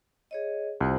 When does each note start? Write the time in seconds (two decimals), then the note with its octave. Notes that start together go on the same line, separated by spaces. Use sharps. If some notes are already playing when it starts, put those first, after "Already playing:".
0.31 G#4 C#5 D#5
0.81 C2 F4 A#4 C5